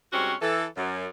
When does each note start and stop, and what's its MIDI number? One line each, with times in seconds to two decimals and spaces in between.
0.12 0.33 44
0.12 0.33 55
0.12 0.33 60
0.12 0.33 61
0.12 0.33 66
0.41 0.65 52
0.41 0.65 69
0.76 1.06 42